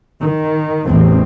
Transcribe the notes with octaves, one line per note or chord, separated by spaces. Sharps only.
D#3
A1 E2 C4